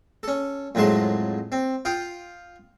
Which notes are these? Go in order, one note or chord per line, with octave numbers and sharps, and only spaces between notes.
C#4 A4
F2 A2 F#3 G#3 A5 C6
C4
F4 F5 G5 D#6